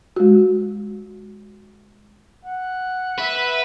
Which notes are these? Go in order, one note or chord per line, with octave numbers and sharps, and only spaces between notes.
G#3 F#4
F#5
B4 E5